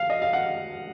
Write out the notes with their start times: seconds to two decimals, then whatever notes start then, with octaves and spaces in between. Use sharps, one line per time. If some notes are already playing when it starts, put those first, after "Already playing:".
Already playing: F5
0.10 D#5
0.22 F5
0.33 F#5